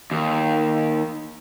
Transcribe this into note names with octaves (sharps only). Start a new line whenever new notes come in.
D#2